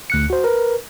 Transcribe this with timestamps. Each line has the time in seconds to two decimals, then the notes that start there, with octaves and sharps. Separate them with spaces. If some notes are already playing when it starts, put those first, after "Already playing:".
0.10 D2 F#6 C#7
0.30 F#4 C5
0.44 A#4 B4